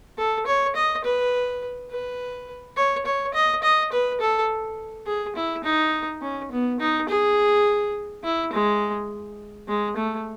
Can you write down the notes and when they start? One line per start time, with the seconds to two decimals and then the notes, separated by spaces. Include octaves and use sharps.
0.18 A4
0.46 C#5
0.75 D#5
1.04 B4
1.90 B4
2.77 C#5
3.06 C#5
3.34 D#5
3.63 D#5
3.92 B4
4.21 A4
5.06 G#4
5.36 E4
5.64 D#4
6.22 C#4
6.51 B3
6.80 D#4
7.09 G#4
8.24 E4
8.52 G#3
9.68 G#3
9.97 A3